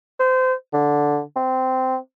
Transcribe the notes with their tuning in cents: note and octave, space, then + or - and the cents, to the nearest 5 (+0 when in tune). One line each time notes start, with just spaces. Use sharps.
C5 -25
D3 -5
C4 -15